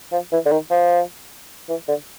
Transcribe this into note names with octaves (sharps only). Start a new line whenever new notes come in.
F3
E3
D3
D#3
F3
E3
D3